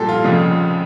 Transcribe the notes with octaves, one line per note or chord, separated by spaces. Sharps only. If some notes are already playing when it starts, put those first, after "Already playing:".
Already playing: A#1 A#2 G3 A4
F4
F1 F2 C#3 F3